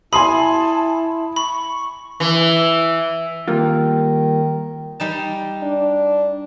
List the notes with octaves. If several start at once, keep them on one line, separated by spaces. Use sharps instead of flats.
E4 G#5 A5 B5 C6 D#6
B5 C#6
E3
D#3 G3 A#3 F4
G3 D#4 A5
D4